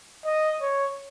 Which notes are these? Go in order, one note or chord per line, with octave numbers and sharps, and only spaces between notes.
D#5
C#5